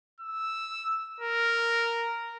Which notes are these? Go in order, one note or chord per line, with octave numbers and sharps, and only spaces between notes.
E6
A#4